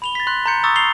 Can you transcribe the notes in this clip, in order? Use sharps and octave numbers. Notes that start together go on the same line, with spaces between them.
B5 F7 G7
A6 B6
C6 F#6
A#5 C6 G6 C#7
A#5 C#6 D#6 E6 A6
C7 F7 G7